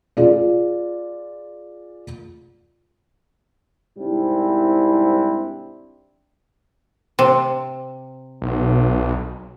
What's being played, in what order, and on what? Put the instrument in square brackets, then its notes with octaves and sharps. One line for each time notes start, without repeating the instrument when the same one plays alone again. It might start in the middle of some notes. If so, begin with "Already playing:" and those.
[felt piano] F4 G#4 D5
[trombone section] C2 G#2 G3 C4 D4 E4
[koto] C3
[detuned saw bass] B1